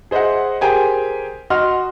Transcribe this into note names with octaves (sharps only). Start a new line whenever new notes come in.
G#4 C5 D#5 E5 F#5
G4 G#4 A#4 C5 G5 G#5
F#4 D#5 F#5 C6 F6